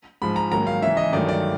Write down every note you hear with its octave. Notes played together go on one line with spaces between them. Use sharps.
G#2 F3 G#3 B5
A#5
G#2 D#3 F#3 A#3 A#5
F5
C#3 E3 G#3 E5
D#5
G2 D#3 F#3 A3 D5
D5